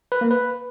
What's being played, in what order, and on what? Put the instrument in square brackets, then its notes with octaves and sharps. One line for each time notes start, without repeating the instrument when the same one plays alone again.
[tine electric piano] B4
A#3
B4